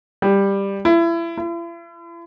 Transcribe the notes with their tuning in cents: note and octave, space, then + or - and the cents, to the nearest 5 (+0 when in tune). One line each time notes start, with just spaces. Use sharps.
G3 +10
E4 +30
E4 +45